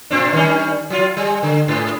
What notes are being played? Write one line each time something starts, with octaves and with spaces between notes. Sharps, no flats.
A2 C4 D4
D#3 G3 C#4
F#3 F4
G3
D3
G#2